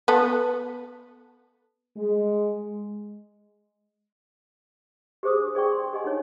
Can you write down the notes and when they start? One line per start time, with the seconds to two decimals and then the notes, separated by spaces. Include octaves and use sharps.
0.08 B3 A4
1.97 G#3
5.23 G4 G#4 C5 D6 D#6
5.38 D4
5.55 G#4 D5 G5 C#6
5.72 C6
5.93 G4 G#4 D#5 F#5 G#5
6.04 D4 D#4 C#5